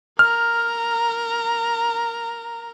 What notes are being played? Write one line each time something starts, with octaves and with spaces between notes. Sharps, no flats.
A#4 A#5 F6